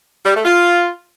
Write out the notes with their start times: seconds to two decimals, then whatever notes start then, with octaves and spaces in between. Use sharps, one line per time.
0.24 G3
0.34 A3
0.45 F4